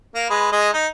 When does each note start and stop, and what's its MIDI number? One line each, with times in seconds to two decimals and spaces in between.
0.15 0.30 58
0.30 0.50 56
0.30 0.50 71
0.52 0.69 56
0.52 0.69 75
0.73 0.87 63